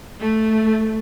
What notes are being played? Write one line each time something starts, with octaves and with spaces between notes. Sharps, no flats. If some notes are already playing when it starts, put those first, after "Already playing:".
A3